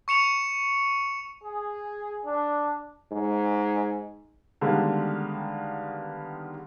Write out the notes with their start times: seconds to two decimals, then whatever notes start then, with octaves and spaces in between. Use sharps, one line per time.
0.08 C#6 C#7 E7 F7
1.43 G#4
2.25 D4
3.12 G#2
4.61 D3 D#3 G3 G#3 A#3 B3